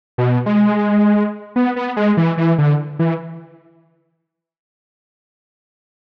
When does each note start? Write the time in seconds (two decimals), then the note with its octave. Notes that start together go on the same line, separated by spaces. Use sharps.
0.18 B2
0.46 G#3
1.56 B3
1.76 B3
1.97 G#3
2.17 E3
2.38 E3
2.58 D3
2.99 E3